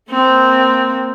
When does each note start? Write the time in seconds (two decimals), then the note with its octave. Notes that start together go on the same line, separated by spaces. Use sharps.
0.10 A#3 C4